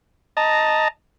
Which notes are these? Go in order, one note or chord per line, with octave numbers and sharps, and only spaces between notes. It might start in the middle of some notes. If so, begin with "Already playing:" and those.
D#5 A5 A#5